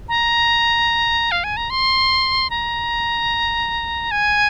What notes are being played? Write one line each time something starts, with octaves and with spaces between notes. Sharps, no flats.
A#5
F5
G#5
A#5
C6
A#5
G#5